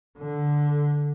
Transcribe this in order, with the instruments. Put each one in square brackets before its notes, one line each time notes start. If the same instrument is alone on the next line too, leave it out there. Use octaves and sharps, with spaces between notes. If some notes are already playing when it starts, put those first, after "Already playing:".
[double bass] D3